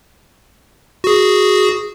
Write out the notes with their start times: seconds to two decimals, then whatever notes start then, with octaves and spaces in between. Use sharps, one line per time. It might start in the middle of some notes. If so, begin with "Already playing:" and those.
1.04 F#4 G#4